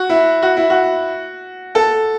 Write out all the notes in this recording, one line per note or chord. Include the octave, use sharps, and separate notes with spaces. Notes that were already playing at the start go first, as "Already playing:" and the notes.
Already playing: F#4
E4
F#4
E4
F#4
A4